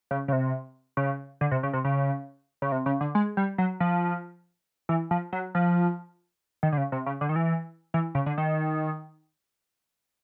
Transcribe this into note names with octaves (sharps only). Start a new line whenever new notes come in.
C#3
C#3
C3
C#3
D3
C3
C#3
C3
C#3
C#3
C3
C#3
D3
G#3
G3
F#3
F3
E3
F3
F#3
F3
D#3
D3
C#3
C3
C#3
D3
D#3
E3
E3
C#3
D3
D#3